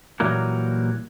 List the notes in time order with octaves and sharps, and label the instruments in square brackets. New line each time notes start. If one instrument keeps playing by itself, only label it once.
[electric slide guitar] A#2 E3 F#3 G3 A#3 A#4